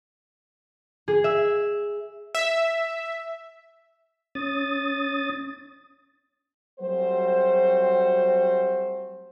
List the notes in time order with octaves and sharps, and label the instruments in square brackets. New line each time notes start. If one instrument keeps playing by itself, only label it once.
[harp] G#4
E5
[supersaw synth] E5
[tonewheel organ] C#4 D#6 A6
[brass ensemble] F#3 G3 A3 C4 F#4 C5